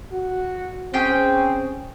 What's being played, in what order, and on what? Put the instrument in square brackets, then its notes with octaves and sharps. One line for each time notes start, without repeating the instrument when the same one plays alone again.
[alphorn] F#4
[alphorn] C4 [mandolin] C#4 G#4 G5